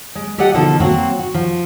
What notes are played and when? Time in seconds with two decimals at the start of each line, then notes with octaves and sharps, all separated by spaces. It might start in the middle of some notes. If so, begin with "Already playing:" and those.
0.15 G#3
0.38 G4 A4 D5 D#5 F#5 G5
0.54 B2 D3 F3 A#3 D#4 A4
0.80 F#3 A#3 C4 F#4
1.19 F#4
1.34 F3